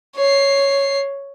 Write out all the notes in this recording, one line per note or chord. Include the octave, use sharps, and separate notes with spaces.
C#5 C7